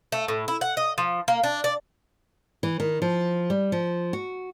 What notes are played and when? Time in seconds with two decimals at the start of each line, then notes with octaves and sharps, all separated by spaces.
0.12 A3
0.28 A2
0.48 E4
0.61 F#5
0.77 D#5
0.98 F3
1.28 A#3
1.44 D4
1.64 D5
2.63 E3
2.80 D#3
3.02 F3
3.50 G3
3.72 F3
4.13 F#4